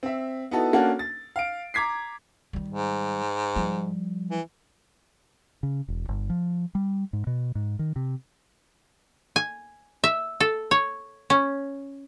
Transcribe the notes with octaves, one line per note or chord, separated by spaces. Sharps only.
C4 E5
B3 D#4 E4 F#4 A4
A#3 C#4 D4 F#4 A4 F#5
A6
F5 D7
A#5 D6 G#6 B6 C7
D#3 G3
G#2
F3 G3
E3
C#3
E1
G1
F3
G3
G#2
B2
G#2
D#3
C3
G#5
E5
A4
C#5
C#4